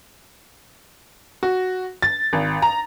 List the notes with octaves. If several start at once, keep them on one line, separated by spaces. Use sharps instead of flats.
F#4
A6
G#1
A#5